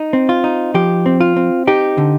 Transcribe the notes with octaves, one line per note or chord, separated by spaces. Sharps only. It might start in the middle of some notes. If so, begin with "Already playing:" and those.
Already playing: D#4
C4
F4
D#4
F3 G4
C4
F4
C4
D#4 G4
D3